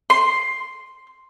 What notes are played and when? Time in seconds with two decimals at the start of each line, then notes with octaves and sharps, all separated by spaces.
0.10 C6